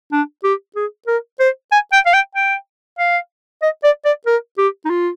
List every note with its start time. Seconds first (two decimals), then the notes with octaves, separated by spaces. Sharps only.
0.12 D4
0.44 G4
0.76 G#4
1.07 A#4
1.40 C5
1.72 G#5
1.93 G5
2.06 F5
2.14 G5
2.35 G5
2.98 F5
3.62 D#5
3.84 D5
4.05 D5
4.27 A#4
4.58 G4
4.85 D#4
4.90 F4